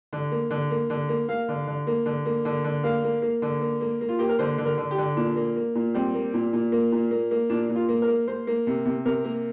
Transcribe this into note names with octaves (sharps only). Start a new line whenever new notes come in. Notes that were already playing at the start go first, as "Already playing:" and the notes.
D3
A#3
D3
A#3
D3
A#3
A#3 F5
D3
D3
A#3
D3
A#3
D3
D3
A#3 F5
A#3
A#3
D3
A#3
A#3
A#3
F4
A#3 G4
A#4
D3 C5
D3
A#4
D3
G4
D3
A#2 D4
A#3
A#3
A#2
G3 C4
A#3
A#2
A#2
A#3
A#2
A#3
A#3
A#2 D4
A#2
F4
A#3
A#4
A#3
A#3 C5
A#3
C3
C3
C3 A#4
A#3